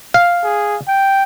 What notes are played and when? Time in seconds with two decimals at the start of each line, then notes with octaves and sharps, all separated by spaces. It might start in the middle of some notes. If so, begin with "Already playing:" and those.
0.14 F5
0.44 G#4
0.88 G5